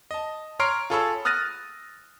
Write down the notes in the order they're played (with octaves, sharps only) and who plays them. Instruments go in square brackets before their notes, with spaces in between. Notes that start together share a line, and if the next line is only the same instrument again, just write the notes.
[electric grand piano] D#5 A5
C#5 A#5 C6 F6 C7 D7
F4 G#4 A4 C#5 B5 E6
D#6 F6 F#6 A6 A#6 D#7